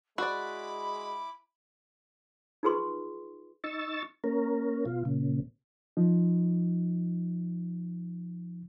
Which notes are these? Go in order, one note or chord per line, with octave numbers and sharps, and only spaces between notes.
G#3 E4 F#4 D5 B5 D6
D#4 F4 G#4 B4 C6 C#6
D#4 C#6 E6 A6
A#3 C#4 A#4
B2 F4
A#2 C#3
F3 D#4